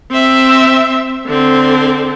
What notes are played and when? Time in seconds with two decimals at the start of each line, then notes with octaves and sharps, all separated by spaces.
0.11 C4 E5
1.26 D3 C4